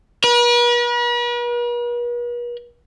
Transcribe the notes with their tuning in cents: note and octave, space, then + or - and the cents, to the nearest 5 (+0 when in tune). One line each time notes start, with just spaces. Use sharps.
B4 -45